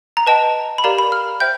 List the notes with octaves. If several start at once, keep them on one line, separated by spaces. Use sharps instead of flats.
A#5
B4 D#5 G5 A5
B5
G4 A#4 D5 F5 A#5
B5
F6
C5 E5 G5 G6